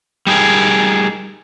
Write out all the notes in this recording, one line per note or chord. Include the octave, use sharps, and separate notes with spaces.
G3 D#4 G#4 A#4